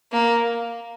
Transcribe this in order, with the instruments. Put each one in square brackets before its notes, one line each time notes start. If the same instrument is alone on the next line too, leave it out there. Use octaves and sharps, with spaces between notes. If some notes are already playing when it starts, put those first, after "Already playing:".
[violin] A#3